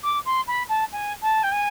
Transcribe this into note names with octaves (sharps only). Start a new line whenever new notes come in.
D6
C6
B5
A5
G#5
A5
G5
G#5